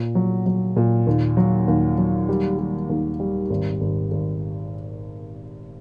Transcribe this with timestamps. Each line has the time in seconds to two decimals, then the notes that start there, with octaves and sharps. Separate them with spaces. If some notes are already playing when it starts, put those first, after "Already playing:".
Already playing: A#2
0.15 F#3
0.46 F#3
0.76 A#2
1.07 D#2
1.37 F#3
1.68 D#2
1.98 F#3
2.29 G3
2.59 G3
2.89 D#2
3.20 G3
3.50 G#1
3.81 G#1
4.11 G#1